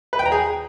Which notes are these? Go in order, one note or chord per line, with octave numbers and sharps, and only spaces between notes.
B4
G5
A#5
G#4